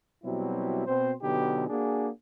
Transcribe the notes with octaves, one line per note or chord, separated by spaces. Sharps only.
B2 F#3 G3 C4 E4
B2 C4 C5
B2 D3 F#3 B3 D#4 G4
A#3 D4 F#4 G#4